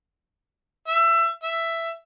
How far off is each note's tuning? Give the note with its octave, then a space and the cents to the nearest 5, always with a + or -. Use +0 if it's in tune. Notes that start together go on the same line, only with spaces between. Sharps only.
E5 +25
E5 +10